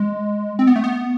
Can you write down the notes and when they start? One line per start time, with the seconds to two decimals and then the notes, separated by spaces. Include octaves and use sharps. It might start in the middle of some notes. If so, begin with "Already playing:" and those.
Already playing: G#3
0.59 C4
0.67 B3
0.76 A3
0.84 B3